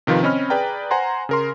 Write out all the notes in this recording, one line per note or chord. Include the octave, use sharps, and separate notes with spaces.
C3 D#3 F3 F4 B4
C4 C#4 D#5 B5 F6
G#4 B4 D5 G5 A#5
C5 F#5 G#5 A#5 C6
C#3 A#4 C6